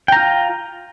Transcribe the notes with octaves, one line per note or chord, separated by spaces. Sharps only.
F4 G5 A#5